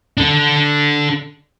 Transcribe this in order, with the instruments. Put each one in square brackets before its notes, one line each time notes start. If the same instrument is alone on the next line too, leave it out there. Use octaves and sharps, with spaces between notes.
[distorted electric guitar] D4 A4